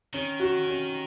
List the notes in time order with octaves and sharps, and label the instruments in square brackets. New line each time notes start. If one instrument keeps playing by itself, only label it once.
[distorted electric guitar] D#3 [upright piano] C#4
[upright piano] F#4
C#4